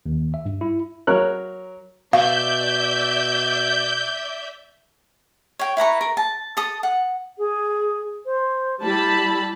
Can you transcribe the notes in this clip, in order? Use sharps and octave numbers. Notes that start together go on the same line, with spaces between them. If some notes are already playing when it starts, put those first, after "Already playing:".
D#2
E5
G2
E4
F#3 A#4 C#5 F#6
B2 D5 E5 F5 G6
C#5 G5
E4 B4 A#5 C#6
A#4
A5
A4 D#6
F#5
G#4
C5
G3 E4 A5 B5